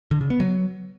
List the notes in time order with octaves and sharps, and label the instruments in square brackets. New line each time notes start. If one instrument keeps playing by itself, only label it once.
[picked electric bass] D3
C#3
B3
F#3